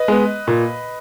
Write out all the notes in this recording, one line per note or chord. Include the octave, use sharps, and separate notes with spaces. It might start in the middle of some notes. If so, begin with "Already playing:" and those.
Already playing: B4 D#5
G#3 B3
A#2